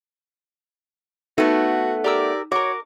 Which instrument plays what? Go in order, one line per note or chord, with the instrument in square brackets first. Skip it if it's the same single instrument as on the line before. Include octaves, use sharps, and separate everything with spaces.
[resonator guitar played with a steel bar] A3 B3 [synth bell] D#4 [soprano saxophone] F#4
[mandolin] G4 A#4 E6 [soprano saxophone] D5
[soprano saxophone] F#4 [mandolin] A#4 D6 [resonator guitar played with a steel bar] C#5